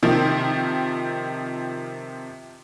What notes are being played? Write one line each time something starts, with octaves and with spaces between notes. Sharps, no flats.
C3 D#3 F3